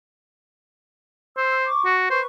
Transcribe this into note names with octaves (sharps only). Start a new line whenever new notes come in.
C5 E6
C#6 D6
F#4
B4 C5 C#6